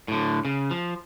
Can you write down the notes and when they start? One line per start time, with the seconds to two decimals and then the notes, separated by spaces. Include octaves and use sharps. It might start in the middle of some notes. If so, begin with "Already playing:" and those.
0.08 A2 D3
0.45 C#3
0.71 F3